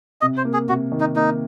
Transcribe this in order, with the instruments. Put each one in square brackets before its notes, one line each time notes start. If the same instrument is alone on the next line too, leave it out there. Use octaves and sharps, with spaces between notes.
[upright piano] C3 [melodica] D#5
[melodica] C5
[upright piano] A#3
[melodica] G#4
[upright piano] C3 [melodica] F#4
[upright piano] D#3
[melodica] D#4
[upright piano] A#3 [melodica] D#4